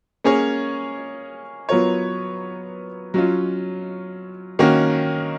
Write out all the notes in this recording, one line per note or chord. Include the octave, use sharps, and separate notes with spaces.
A#3 C#4 G#4 C#5
F#3 B3 F4 A#4 C#5
F#3 C#4 F4
D#3 A#3 C#4 F#4